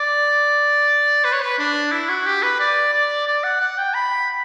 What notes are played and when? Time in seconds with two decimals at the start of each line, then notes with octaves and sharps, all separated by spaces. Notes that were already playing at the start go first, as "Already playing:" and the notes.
Already playing: D5
1.24 B4
1.33 C#5
1.42 B4
1.59 D4
1.92 E4
2.09 F#4
2.26 G4
2.43 B4
2.60 D5
2.93 D5
3.27 D5
3.44 F#5
3.61 F#5
3.78 G5
3.94 B5